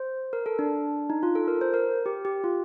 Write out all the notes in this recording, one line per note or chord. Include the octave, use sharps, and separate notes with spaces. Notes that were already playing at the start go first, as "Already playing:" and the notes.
Already playing: C5
A#4
A4
D4
D#4
F4
A4
A#4
C5
A#4
G4
G4
F4